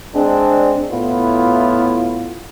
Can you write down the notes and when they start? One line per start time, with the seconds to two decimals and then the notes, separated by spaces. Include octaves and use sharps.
0.14 G#3 C4 D4
0.90 A2 B3 E4 F4